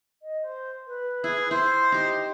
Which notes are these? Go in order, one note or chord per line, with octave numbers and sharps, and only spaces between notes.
D#5
C5
B4
E4 G#4
E4 C5 C6
D#4 G4